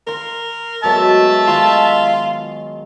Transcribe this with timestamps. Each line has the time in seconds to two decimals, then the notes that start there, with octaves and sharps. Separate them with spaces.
0.07 A#4 F5 C6
0.84 B2 F#3 G#3 E5 A5
1.47 D#3 F4